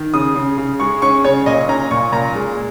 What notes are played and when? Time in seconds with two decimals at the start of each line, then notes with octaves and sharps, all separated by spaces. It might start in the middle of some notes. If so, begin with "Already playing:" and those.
Already playing: D#3
0.14 C#3 D#6
0.36 C#3
0.58 C#3
0.80 G#3 C#6
1.02 C#4 C#6
1.25 C#3 C#5
1.46 A#2 D#5
1.68 C#4 A#5
1.91 A#2 C#6
2.12 A#2 A#5
2.35 G#3